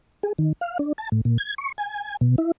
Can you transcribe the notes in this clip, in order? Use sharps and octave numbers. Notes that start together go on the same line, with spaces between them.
G#4
D#3
F5
D4
A5
A2
A#2
G#6
C#6
G#5
B2
E4